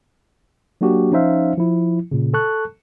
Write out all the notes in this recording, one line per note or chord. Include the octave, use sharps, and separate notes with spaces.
F#3 A#3 D4 F#4 G4
F3 C#4 D#4 C5 E5 F5
F3 E4
A#2 C#3
A4 A5 C#6 F#6